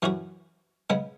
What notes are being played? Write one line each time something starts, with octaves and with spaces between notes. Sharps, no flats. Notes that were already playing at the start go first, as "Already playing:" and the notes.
F#2 E3 C#4 F#4
C#3 G#3 B3